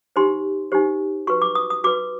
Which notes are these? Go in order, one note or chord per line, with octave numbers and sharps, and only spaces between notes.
D#4 G4 C5 C6
D#4 G4 C5
F#4 B4 C#6
D6
D#6
D#6
F#4 B4 D6